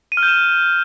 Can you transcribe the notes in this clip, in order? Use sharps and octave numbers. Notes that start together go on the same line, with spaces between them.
D#7
F6
G6
E7